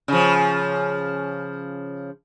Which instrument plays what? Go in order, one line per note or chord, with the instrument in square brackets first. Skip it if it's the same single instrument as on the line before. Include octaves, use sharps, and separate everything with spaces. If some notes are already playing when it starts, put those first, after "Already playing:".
[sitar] C#3 F3